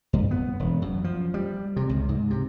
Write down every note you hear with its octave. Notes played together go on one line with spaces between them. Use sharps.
G2
B3
E1
F#2
F3
G3
C3
C#2
G#2
C3